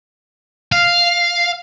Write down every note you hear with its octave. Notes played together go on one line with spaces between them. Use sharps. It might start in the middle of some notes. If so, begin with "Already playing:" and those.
F5